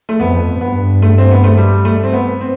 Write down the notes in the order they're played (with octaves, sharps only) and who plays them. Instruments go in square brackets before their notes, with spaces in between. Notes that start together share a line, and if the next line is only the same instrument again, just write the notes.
[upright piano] A3
[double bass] F2 [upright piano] B3
[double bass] G2 [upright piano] B3
[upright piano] A3
C4
B3
A3
G3
A3
C4
B3
C4